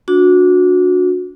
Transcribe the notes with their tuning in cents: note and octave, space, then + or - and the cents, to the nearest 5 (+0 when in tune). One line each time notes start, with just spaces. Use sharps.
D4 -15 F#4 -25